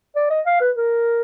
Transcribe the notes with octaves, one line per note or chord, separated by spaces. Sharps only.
D5
D#5
F5
B4
A#4